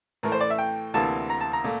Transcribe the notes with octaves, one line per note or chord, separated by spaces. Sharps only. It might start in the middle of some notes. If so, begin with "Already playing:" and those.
A2 E3 A3 A#4
C5
D5
E5
G5
D2 C3 E3 A#3 A5
A#5
A5
A#5
A#2 A3